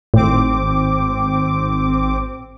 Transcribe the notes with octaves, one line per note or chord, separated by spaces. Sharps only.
G#1 A2 C4 D6